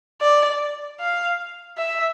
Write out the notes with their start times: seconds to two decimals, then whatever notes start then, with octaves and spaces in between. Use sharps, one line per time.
0.21 D5
1.00 F5
1.78 E5